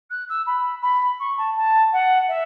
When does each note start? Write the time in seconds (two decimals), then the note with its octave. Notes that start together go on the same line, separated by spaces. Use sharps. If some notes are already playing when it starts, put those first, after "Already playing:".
0.10 F#6
0.29 E6
0.46 B5
0.82 B5
1.19 C#6
1.37 A5
1.56 A5
1.92 F#5
2.28 E5